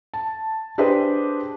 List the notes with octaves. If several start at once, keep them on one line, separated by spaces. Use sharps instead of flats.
A5
D4 G4 G#4 B4 C5 D#5